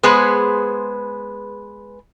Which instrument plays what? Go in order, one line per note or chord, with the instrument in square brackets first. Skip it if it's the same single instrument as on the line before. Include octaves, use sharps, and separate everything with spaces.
[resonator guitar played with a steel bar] G#3 B3 G#4 B4 C5